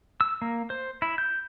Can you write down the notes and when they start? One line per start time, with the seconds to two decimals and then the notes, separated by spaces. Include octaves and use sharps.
0.21 E6
0.42 A#3
0.70 C5
1.02 E4
1.18 G6